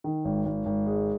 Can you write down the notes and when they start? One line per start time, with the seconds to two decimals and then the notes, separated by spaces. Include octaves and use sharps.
0.04 D#3
0.25 G#1
0.46 G#1
0.66 G#1
0.86 G#3